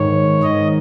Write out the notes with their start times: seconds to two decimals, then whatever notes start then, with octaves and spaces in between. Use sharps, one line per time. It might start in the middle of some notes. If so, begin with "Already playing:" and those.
Already playing: G#2 D#3 C#5
0.43 G#2 D#3 D#5